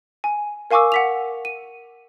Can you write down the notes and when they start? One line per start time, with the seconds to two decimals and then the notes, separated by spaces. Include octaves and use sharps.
0.24 G#5
0.71 A#4 F5 G#5 C#6 D6 E6
0.92 F#5 B6 F7
1.45 D#7